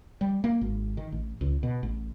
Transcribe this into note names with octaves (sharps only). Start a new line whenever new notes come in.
G3
A#3
G#1
D#3
A1
C#2
B2
A1